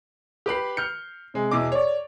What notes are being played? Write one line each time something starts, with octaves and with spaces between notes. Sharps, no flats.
G4 B4 B5 C7
F6 G6 C#7
C3 G#3
E2 B2 D#5 D6
C#5 D5